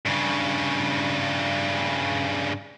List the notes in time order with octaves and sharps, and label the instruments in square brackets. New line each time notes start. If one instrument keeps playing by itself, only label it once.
[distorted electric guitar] G2 C#3